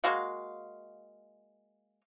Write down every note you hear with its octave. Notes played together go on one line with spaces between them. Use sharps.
G#3 A#3 F#4 F5